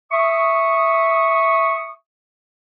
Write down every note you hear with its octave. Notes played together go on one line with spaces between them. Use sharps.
E5 C#6 D#6